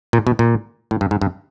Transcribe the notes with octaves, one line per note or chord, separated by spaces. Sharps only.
A#2
B2
A#2
A2
G2
G#2
G2